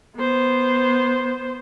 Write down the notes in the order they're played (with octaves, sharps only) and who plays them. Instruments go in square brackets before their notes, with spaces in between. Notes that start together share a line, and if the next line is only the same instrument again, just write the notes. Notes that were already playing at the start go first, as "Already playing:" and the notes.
[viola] B3 C5